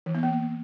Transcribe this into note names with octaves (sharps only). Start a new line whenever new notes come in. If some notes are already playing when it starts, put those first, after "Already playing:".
E3
B3
A#3